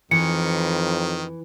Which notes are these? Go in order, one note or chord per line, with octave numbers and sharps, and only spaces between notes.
F2 D#3 E3 C#7